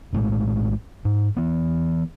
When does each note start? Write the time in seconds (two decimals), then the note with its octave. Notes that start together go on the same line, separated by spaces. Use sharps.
0.13 A#1 A2 D3 G#3
1.05 G#2
1.37 E3 B3